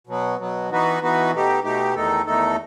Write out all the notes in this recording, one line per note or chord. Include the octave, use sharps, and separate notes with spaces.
B2 F#3 B3
B2 F#3 B3
E3 B3 D#4 F#4 B4
E3 B3 D#4 F#4 B4
B2 A3 D#4 G4
B2 A3 D#4 G4
E2 D#3 A3 D#4 A4
E2 D#3 A3 D#4 A4